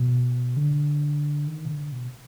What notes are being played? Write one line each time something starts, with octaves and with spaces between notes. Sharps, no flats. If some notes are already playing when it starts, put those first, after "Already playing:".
Already playing: B2
D3
D#3
B2
D3
B2